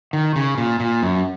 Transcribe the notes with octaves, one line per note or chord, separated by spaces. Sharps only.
D#3
C#3
A#2
A#2
F#2